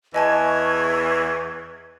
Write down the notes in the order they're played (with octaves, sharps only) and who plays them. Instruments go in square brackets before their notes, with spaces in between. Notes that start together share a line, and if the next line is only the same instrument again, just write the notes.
[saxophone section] E2 E3 [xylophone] D#5 G#5 A5 [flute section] C#6 G#6